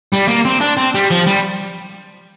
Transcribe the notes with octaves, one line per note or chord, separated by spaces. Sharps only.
G3
A#3
C4
D4
C4
G3
F3
G3